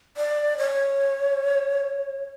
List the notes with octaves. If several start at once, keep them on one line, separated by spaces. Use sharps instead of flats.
D5
C#5